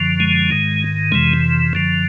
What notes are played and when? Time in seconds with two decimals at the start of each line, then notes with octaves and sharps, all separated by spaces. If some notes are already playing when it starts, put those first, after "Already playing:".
Already playing: F#2 D3 F3
0.20 G#3
0.51 G#2 D#3
1.12 F2 C3 E3 G#3
1.73 F#2 D3 F3